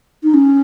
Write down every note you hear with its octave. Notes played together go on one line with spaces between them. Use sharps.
D#4
C#4